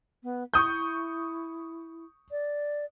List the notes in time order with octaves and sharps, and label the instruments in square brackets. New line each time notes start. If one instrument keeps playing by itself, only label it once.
[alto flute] B3
[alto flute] E4 [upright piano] C#6 D#6 G6
[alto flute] D5